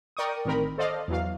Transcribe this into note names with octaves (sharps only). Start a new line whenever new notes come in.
A#4 D5 G5 C#6 D#6
A1 D#3 C4 A#4 B5
A4 C5 D5 D#5 F5
E2 E3 F#3 F5